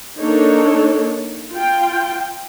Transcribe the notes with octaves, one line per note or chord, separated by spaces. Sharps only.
A#3 D4 D#4 A4 C#5
F4 G5